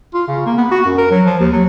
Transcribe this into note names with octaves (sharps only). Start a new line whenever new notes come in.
F4
C#3
A#3
B3
F#4
F#2
A#4
F#3
F3
D#2
F#3